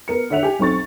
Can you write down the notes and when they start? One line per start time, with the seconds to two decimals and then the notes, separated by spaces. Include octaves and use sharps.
0.08 B3 A#4 C#7
0.30 D3 C#5 E5 F#5 F7
0.43 G4 G#5
0.59 B1 C4 C#6 A6